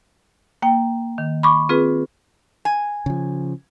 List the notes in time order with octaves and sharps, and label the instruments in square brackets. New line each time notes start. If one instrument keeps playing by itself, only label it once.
[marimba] A#3 G5
D#3
B5 C#6 D6
C4 F4 G#4 B4
[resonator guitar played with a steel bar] G#5
[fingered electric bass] C#3 F3